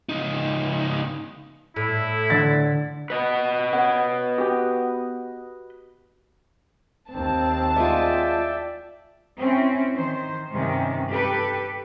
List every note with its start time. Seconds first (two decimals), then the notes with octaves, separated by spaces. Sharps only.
0.09 C#2 D#4
1.76 A2 E4
2.30 D3 A6
3.10 B4 D#5
3.73 B3 C#5 F#5
4.38 F#4 G4
7.11 D#2 C4 A5
7.76 G#3 F4 D5 E5 G5
9.39 C4 C#4 E4
9.95 D#3 C5
10.51 G2 C3 D#3 C#4
11.09 G4 A4 B4